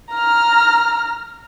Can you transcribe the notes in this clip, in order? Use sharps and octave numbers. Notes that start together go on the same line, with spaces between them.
A#5 F6